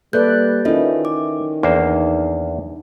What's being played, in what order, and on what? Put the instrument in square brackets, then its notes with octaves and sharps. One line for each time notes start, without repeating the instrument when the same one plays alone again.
[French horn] G3 [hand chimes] A#3 F#6 G6 [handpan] A4 B4 D5
[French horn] D#3 [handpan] C#4 E4 [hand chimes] F4 A4 B4 [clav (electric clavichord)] D#5
[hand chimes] D6
[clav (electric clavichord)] E2 A#3 C5 [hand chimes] D4 D#4